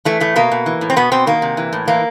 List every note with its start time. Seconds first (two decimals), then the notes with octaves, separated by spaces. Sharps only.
0.05 E3 A3
0.20 A2 A3
0.36 B2 A#3
0.52 B2
0.66 E3
0.81 A2
0.90 C4
0.96 B2 B3
1.11 B2 C4
1.27 D#3 A#3
1.42 C3
1.57 E3
1.73 A2
1.88 E3 A#3